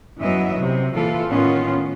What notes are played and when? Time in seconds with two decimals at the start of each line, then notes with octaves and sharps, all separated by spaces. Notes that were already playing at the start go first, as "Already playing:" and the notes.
0.20 F#2 E3 F#3 B3 D#5 E5
0.58 C3
0.95 A#2 E3 F4 A4
1.28 A2 D#3 B3 C#4 F4